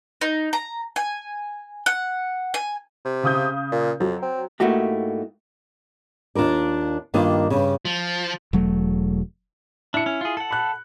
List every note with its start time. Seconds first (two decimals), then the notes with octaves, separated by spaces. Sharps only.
0.21 D#4
0.53 A#5
0.96 G#5
1.86 F#5
2.54 G#5
3.05 C3
3.23 C#3 D#6 G6
3.72 A#2
4.00 F2 F#3
4.22 C4
4.60 G#2 A3 A#3 E4 F#4 G4
6.35 D#2 D4 F4 A#4 D5
7.14 G2 D#3 A#3 D4 F4 D#5
7.50 G2 C#3
7.85 F3
8.53 E1 F#3 A3
9.94 D4 E4 C#7
10.06 C#4
10.21 F4 G#4
10.37 A4 F#5
10.51 B5 F#6